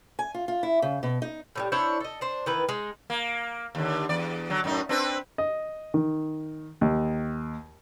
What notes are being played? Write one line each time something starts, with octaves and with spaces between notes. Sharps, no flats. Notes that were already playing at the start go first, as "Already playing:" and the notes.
G#5
F4
F4
E4
C#3
B2
D#4
A2 F3 G3
D4 E4 C5 C#5
A4 D#5
D4 C5
D#3 E3 B4
G#3 D#4
A#3
D#2 D3
E2 D5
D3 F#3
F#2 A2 D#4
C4 D4 B4
D#5
D#3
D#2